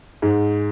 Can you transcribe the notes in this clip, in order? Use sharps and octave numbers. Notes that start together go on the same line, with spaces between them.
G#2